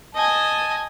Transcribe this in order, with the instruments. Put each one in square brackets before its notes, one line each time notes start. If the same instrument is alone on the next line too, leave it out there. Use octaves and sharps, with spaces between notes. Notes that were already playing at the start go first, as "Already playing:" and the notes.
[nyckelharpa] D#5 G#5 [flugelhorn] A5